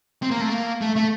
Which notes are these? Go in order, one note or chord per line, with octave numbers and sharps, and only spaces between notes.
C4
A#3
A3
A#3
A3
A3